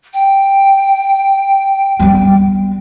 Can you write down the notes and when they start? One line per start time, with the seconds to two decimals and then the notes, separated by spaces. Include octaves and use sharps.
0.13 G5
1.99 G3 B3